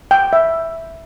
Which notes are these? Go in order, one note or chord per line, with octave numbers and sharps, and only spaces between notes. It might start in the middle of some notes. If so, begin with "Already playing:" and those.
G5
E5